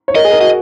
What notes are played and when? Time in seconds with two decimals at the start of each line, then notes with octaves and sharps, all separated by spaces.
0.08 C#5
0.15 A#4 D#5
0.25 G#4
0.32 A#4
0.40 F#4 D#5